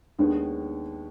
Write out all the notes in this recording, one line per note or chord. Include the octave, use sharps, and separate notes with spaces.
D#2 D#3 G#3 B3 D4